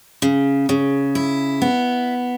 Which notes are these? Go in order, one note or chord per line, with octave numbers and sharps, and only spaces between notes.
C#3
C#3
E4
B3